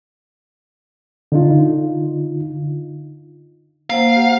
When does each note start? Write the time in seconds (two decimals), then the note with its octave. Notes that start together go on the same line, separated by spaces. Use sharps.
1.32 D3 D#4 F4
3.90 A#3 C5 F5 F#5
4.16 G4